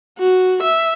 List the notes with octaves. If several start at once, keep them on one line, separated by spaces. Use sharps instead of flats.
F#4
E5